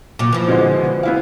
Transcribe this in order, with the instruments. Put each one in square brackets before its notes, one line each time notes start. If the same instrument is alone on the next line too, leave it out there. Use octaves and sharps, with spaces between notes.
[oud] A#2 F#3 [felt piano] D6
[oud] E3 F3
[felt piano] B2 D3 G#3
B3 E4 F5